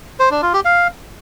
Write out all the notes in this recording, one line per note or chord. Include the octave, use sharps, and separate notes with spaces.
C5
D4
F4
G4
F5